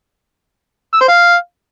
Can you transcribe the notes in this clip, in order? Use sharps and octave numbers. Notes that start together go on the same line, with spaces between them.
E6
C5
F5